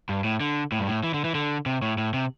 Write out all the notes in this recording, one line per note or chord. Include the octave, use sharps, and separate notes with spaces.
G2
A2
D3
A2
G2
A2
E3
D3
E3
D3
C3
A2
A2
C3